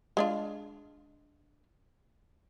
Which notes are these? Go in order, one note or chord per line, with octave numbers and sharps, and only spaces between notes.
G#3 D4 F4